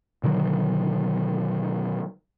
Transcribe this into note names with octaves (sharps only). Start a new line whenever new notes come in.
B2 D3 D#3 F#3